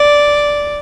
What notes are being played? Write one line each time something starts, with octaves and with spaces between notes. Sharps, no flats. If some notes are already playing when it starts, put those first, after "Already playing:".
Already playing: D5